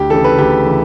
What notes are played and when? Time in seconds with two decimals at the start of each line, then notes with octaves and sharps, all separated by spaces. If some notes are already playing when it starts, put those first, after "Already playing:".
Already playing: D2 G4
0.10 C#3 E3 A4
0.24 B4
0.38 D2 G4
0.66 C#3 E3